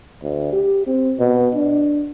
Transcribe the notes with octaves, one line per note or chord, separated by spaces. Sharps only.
D2
G4
C4
B2
D4